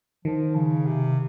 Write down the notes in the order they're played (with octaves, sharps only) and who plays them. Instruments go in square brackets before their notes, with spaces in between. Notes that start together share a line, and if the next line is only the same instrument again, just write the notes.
[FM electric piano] D#3 [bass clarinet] F3
[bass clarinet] C#3
C3